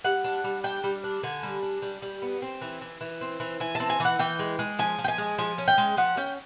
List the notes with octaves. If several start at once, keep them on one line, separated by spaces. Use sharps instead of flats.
G3 F#5
D4
G3
D4 G5
G3
D4
D3 G#5
G3
D4
G3
G3
B3
C4
E3
E3
E3
C4
E3
E3 G#5
C4 A5
G#5
E3 F#5
E3 G5
G#3
G#3
F3 G#5
F3
G5
G#5
G#3
F3 G#5
C#4
G5
G#3
F3 F#5
C#4 G5